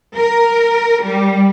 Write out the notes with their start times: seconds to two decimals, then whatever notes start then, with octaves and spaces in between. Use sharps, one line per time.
0.16 A#4
1.03 G3